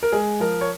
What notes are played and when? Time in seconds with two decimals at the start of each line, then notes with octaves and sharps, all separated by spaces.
0.03 A#4
0.12 G#3 G#4
0.40 F3 A#4
0.61 C#5